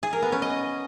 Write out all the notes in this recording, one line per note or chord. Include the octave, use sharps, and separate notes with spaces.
G#4
A#4
B3
C#4
D#5